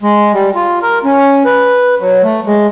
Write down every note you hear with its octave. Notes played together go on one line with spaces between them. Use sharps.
G#3
G3
F4
A#4
C#4
B4
F#3
A3
G#3